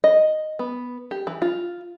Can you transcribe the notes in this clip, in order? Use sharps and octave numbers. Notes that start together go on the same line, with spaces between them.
D#5
B3
G4
E3
F4